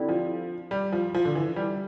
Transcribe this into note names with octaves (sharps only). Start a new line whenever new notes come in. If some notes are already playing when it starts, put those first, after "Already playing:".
Already playing: D3 G3 C4 E4
F3
G3
F3
F3
D3
E3
G3